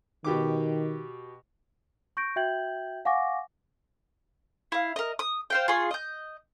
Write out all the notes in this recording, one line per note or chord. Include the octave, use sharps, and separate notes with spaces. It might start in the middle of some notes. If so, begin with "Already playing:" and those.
B2 D#3 G4 D6
C#6 G6 A#6 D7
F#4 E5 G5 G6 G#6 F#7
F5 F#5 G#5 C#6 D6 A#6
E4 F5
A#4 D#5
D#6
C5 F5 G5
F4 G#4 C6 C#6
D#5 G6